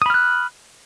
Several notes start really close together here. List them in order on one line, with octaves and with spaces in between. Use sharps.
D#6 B5 F6 F#6